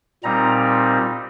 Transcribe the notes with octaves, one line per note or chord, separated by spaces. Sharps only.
A#2 G3 C4 D#4 A#5